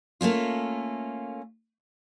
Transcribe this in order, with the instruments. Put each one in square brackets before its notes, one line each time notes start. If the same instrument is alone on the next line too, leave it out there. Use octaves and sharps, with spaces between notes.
[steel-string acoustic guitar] A3 A#3 C#4 F4